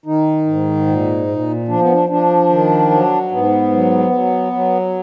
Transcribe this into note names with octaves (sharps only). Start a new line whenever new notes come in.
D#3 D#4
G#2
A#2
A#2
F3 D4
B3
D4
F3 D4
D#3
F#3
G#2 B3
F#3
F#3
F#3